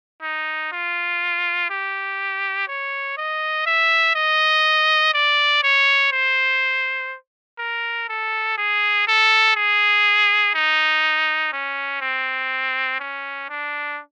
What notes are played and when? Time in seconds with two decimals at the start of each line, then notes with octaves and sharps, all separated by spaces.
0.22 D#4
0.72 F4
1.70 G4
2.68 C#5
3.17 D#5
3.66 E5
4.15 D#5
5.14 D5
5.63 C#5
6.12 C5
7.59 A#4
8.09 A4
8.58 G#4
9.07 A4
9.56 G#4
10.55 D#4
11.53 C#4
12.01 C4
13.00 C#4
13.49 D4